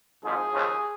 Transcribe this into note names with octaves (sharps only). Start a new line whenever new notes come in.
G#1 G#2 F3 G#4
D#2 C#3 F3